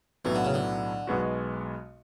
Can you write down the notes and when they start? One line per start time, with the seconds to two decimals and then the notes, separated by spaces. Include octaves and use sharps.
0.25 B1 A2 E3 F#3 B3
0.35 D3
0.45 C#3
0.54 D3
1.07 B1 B2 G#3 B3 F#4